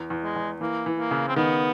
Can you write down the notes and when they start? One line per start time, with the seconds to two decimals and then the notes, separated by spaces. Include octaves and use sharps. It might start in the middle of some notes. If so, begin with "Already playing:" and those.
Already playing: E2
0.10 E2
0.23 G#3
0.36 E2
0.61 E3 A#3
0.86 E3
0.99 A#3
1.11 C#3
1.28 C4
1.36 D#3 B3